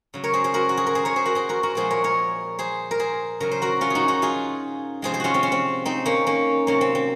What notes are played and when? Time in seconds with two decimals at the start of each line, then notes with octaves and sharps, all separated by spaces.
0.14 C#3 F#3
0.24 A#4 C#5
0.33 G#4 C5
0.44 G#4 C5
0.54 F#4 A#4
0.69 F#4
0.77 G#4
0.87 A#4
0.95 G#4 C5
1.05 A#4 C#5
1.16 G#4 C5
1.25 F#4 A#4
1.35 G#4 C5
1.49 F#4 A#4
1.63 F#4 A#4
1.75 A#2 F3 G#3 G#4 C5
1.91 A#4 C#5
2.04 A#4 C#5
2.59 G#4 C5
2.91 A#4
2.99 G#4 C5
3.40 C#3 F#3 A#4
3.51 C5
3.62 F#4 A#4
3.81 C#4 F4
3.90 D#4 F#4 G#4
4.08 D#4 F#4
4.22 F4 G#4
5.02 C3 F3 G#3 G#4 C5
5.14 G#4 C5
5.20 C#4 F4 F#4
5.34 C4
5.43 C#4
5.52 C4
5.85 C4 D#4
6.06 A#3 C#4
6.27 A#3 C#4
6.67 C3 F#3 A#3 C#4
6.81 C4
6.95 C4